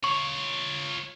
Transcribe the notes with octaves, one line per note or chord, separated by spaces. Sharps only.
F4 C#5 C#6